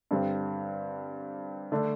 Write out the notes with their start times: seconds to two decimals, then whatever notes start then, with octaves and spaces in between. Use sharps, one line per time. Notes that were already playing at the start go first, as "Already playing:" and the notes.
0.11 G2 D3 G3 C4
1.72 D3 A3 D4